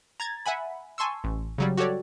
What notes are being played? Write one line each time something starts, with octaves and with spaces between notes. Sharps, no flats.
A#5 G#6 A6
E5 F#5 G#5 B5
G#5 A5 C6 C#6 E6
A1
C#3 F#3 G3
F#4 G4 A4 C#5 D5